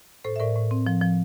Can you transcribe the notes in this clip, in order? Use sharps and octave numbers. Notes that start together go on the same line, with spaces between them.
A2 A4 C5
E5
A2 A#4 D5
A2
C4
F3
F3